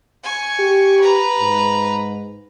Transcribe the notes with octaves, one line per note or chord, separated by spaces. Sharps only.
G#5 C#6
G4
B4 A#5
G#2